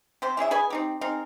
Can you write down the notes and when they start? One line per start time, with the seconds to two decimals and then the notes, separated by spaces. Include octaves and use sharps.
0.22 C3 G4 C5
0.37 E3 C#4 G#4 E5
0.51 G#4 B4 D#5 G#5
0.70 C4 D#4 G4
1.01 C4 D#4 G#4 A#4